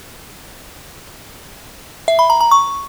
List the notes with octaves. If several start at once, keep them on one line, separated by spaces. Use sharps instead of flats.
E5
B5
A#5
A#5
C#6